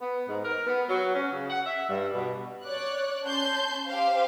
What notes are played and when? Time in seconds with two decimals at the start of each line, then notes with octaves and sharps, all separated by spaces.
0.01 B3
0.29 G#2
0.44 A#4
0.66 B3
0.89 F#3
1.15 C#4
1.32 C#3
1.50 F#5
1.66 E5
1.89 G2
2.15 B2
2.65 C#5 D5 F#6
3.24 C#4 A5 C6 G6
3.88 G4 C5 F5